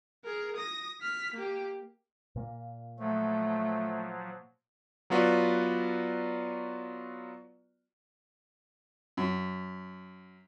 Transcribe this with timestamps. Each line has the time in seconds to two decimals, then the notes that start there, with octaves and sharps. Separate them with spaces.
0.24 G#4 A#4
0.56 D#6 A#6
1.01 F6 B6
1.34 A#3 G4
2.36 A#2 A#3
2.99 F3 F#3 A3
5.10 F#3 B3 F4 F#4 B4 D5
9.17 F#2